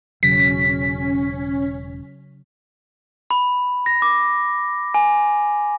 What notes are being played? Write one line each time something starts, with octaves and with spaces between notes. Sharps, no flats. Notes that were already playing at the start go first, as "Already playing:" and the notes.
E1 C#3 F#3 C#4 B6
B5
A#6
D6
G#5